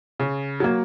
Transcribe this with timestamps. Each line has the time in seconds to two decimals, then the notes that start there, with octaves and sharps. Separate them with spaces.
0.20 C#3
0.60 F#3 A#3